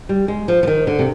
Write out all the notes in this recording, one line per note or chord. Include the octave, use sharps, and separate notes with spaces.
G3
G#3
F3
F3
D#3
D3
C3